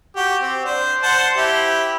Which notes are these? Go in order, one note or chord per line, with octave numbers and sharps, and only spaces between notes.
F#4 G4
C4
D4 C5
C5 F#5 A5
E4 G4